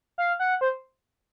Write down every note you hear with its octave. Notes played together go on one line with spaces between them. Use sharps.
F5
F#5
C5